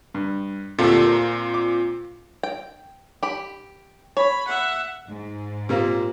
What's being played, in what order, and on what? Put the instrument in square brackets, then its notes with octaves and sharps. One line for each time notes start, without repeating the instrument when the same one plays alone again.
[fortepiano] G2
[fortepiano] D2 G4 A4 [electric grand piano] A#2 C4 F4
[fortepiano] A#4
D6
[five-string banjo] G5
G4 B5
[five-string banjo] C#5 [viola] B5
[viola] E5 F#5
[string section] G#2
[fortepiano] A#2 A#3 C4 [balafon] G4 A#4 F5